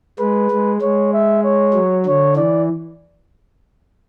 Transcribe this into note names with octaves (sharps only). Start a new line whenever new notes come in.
G#3 B4
G#3
G#3 C#5
E5
C#5
F#3
D3 C#5
E3 D5